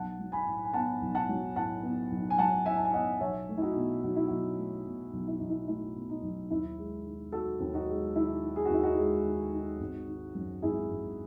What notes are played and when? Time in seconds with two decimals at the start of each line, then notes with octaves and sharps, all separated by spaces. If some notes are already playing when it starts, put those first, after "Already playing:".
Already playing: B1 F#5 A5
0.19 F#3
0.32 G#5 B5
0.46 A2
0.65 G#5
0.73 B3 F#5 A5
1.01 B1
1.15 F#5 A5
1.29 F#3
1.56 A2 F#5 A5
1.83 B3
2.11 B1
2.30 G#5
2.38 F#3 F#5 A5
2.66 A2 E5 G#5
2.76 A5
2.85 G#5
2.93 B3 D#5 F#5
3.20 B1 C#5 E5
3.49 A3
3.57 E4
3.62 D#4 F#4
3.76 B2
4.03 B1 F#4
4.16 E4
4.28 B1 D#4 F#4
4.58 A3
4.85 B2
5.13 B1
5.27 E4
5.38 B1 D#4
5.50 E4
5.68 A3 E4
5.96 B2
6.10 D#4
6.23 B1
6.51 D#2 E4
6.78 G#3
7.06 D#3
7.32 D#4 F#4 A4
7.60 D#2
7.74 D#4 F#4
7.89 G#3
8.15 D#3 E4
8.43 D#4
8.56 G#4
8.65 F#4
8.70 D#2 E4
8.83 D#4 F#4
8.98 G#3
9.26 D#3
9.53 D#4
9.80 G#1
10.08 D#3
10.35 F#2
10.62 G#1 E4 G#4
10.90 G#1